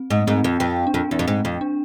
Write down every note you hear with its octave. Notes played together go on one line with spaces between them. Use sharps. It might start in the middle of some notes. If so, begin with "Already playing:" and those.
Already playing: C4
G#2
G#2 C4
F2
F2
D4
F2 C4
E2
F2
G#2
F2
D4